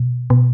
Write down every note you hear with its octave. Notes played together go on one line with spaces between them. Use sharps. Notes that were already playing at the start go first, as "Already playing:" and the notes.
Already playing: B2
B2